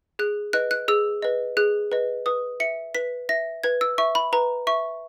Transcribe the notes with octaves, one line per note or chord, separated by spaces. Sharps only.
G#4 F#6
B4 D#5 F#6
F#6
G#4 E6
B4 D#5
G#4 F#6
B4 D#5
B4 D#6
E5 C#7
B4 B6
E5 A#6
B4 G#6
E6
E5 C#6
B5
B4 A#5
E5 C#6